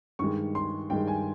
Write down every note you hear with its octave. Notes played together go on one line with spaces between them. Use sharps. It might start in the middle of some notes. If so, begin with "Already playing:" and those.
G2 D#3 G#3 C#6
C6
G2 D#3 G#3 G5
G#5